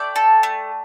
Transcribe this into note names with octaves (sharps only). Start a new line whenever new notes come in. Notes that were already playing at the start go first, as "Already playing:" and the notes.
Already playing: A3 D5 G5
A4
A3